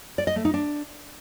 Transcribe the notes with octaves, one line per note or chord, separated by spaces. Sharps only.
D5
D#5
A3
D#4
D4